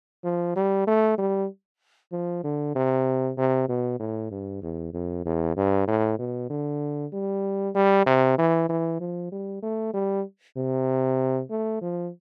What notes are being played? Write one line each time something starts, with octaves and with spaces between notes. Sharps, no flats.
F3
G3
A3
G3
F3
D3
C3
C3
B2
A2
G2
E2
F2
E2
G2
A2
B2
D3
G3
G3
C3
E3
E3
F3
G3
A3
G3
C3
A3
F3